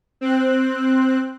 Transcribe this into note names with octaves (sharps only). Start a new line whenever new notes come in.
C4 F#6